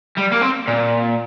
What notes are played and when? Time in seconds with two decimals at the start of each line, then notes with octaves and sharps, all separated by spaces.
0.18 G3
0.32 A#3
0.42 C4
0.68 A#2